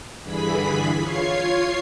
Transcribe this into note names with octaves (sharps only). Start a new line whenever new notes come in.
G2 D3 E3 G#4 B5 B6
F4 C#5 G#6 C7